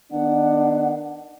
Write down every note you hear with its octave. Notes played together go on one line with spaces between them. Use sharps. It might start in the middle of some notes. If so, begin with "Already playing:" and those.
D#3 B3 D4 F#5